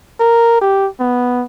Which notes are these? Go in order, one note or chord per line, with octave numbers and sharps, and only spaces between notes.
A#4
G4
B3